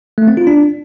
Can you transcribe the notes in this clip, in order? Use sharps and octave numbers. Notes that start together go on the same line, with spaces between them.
A3
C4
F4
D4